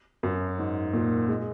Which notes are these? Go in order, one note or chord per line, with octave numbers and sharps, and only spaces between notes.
F#2
G#2
A#2
G#3